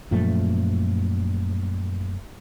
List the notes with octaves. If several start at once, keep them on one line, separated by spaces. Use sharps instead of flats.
F#2 A#2 F3 A3